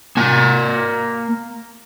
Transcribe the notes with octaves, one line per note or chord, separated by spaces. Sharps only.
A#3 G#5